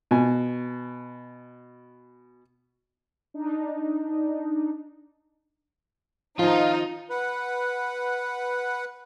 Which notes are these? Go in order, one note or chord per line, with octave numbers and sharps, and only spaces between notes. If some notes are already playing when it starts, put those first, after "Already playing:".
B2 G#5
D4 D#4
D#3 F3 D#4 F4
B4 F#5